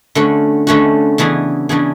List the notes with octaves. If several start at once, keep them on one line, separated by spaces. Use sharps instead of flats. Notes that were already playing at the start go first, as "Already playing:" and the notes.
D3 A3 C#4 F#4
D3 A3 C#4 F#4
C#3 E3 B3 D4 G#4
C#3 E3 B3 D4 G#4